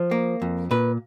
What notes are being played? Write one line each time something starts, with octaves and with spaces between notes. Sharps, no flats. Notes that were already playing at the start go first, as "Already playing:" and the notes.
Already playing: F3
A#3
F2
A#2 B4